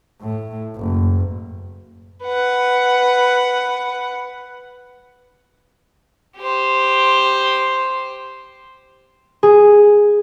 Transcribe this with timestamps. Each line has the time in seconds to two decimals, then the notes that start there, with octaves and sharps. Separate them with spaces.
0.21 A2
0.76 F#1
2.23 B4 F#5
6.38 G4 C5
9.43 G#4